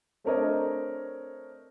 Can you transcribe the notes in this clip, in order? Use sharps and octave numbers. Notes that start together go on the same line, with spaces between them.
A3 C4 D4 A#4 C#5 D#5